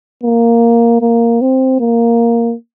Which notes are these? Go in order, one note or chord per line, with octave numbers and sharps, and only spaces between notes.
A#3
A#3
C4
A#3